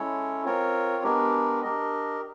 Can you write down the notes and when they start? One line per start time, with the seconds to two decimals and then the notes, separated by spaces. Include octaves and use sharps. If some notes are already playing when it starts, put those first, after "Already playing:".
Already playing: G#3 C#4 E4 A4 C#5
0.45 C4 F4 A#4 C#5
1.03 G#3 B3 D4 G4 A#4
1.62 D4 G4 A#4 D#5